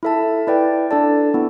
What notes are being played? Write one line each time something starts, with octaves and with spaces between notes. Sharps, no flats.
E4 A4 E5 A5
E4 B4 D5 G5
D4 A4 D5 A5
B3 E4